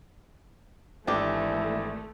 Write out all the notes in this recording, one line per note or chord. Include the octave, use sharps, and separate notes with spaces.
G#1 E3 A3 D4 G4